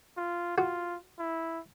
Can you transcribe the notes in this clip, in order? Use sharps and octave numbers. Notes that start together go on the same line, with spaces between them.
F4
F4 F#4
E4